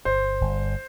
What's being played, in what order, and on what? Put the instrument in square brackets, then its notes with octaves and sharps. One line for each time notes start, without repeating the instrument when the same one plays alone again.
[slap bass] G1 [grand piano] C5
[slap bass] G1